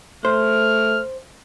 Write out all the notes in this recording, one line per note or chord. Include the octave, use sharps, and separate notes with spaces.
A3 C5 F6